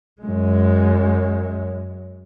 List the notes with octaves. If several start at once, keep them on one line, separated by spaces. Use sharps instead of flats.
F#2 G#3